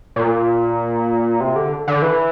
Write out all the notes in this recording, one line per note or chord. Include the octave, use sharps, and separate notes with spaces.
A#2
C3
D3
D3
E3